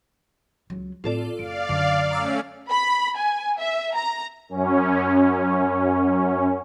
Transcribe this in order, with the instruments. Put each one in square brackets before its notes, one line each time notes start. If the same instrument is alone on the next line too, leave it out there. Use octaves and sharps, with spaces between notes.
[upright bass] C#2 F#3
[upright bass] A2 C4 [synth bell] F4 A4 D5
[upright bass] F#1 [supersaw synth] D5 F5 [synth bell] D7
[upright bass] F#2 [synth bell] D3
[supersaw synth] A3 C#4 [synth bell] A#5 D6 E6
[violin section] B5
G#5
E5
A#5
[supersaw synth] F#2 C#4